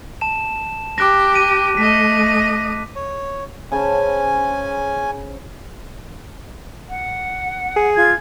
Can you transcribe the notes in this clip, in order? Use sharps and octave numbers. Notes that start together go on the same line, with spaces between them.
A5 E7
G4 D6 F#6 A#6
D#7
A3 D#5 B6
C#5
C#3 C#4 C5 G#5 A5
F#5
G#4
F4 G#6